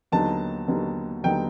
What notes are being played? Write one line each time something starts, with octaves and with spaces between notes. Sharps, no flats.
D#2 D3 F#3 B3 D#4 A5
D#2 D3 F#3 B3 D#4
D#2 D3 F#3 B3 D#4 G5